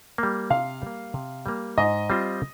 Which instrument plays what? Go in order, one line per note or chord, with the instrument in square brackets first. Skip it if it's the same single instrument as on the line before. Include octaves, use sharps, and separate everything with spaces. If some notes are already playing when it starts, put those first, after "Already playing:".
[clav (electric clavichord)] G3 A#3
[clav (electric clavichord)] C3 [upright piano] F5
[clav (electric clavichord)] G3 A#3
C3
G3 A#3
[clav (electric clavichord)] G#2 [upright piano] D#5
[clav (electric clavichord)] G3 C4 F4 C5